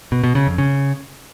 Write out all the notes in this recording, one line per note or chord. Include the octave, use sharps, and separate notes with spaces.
B2
B2
C#3
F2
C#3